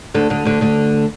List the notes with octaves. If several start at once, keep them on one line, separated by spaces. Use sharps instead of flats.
D2 D3
D2 D3
D2 D3
D2 D3